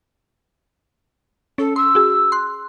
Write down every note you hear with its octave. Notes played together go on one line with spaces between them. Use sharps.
C#4 A4
C6 E6
F#4 G#4
C6 F#6